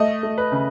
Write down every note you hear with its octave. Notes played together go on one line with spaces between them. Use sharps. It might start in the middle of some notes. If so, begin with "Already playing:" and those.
Already playing: A3 D#5
A3
B4
C#3